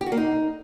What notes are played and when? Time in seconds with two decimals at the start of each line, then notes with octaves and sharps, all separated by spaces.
0.01 G4
0.06 F#4
0.12 A#3
0.17 D#4